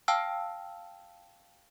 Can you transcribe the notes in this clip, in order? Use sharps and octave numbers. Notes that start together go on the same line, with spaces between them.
F5 G5 A5 E6 F6